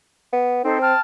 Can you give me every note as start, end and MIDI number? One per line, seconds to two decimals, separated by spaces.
0.33 0.64 59
0.64 0.93 60
0.64 0.79 63
0.64 0.79 69
0.64 0.79 72
0.81 1.01 79
0.81 1.01 81
0.81 1.01 89